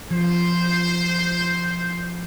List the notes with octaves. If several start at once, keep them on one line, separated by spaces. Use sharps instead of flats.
F3 C5